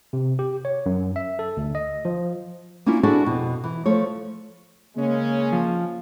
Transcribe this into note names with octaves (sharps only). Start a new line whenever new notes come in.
C3
G4
C#5
F#2
E5
A4
D2
D#5
F3
A#3 C#4 D4 E4 F4
D4 E4 F#4 G#4 A4 D5
F2 B2
E3
F3 A3 C#5
C#3 G#3 A#3 C#4
F3